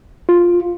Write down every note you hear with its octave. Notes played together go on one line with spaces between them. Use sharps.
F4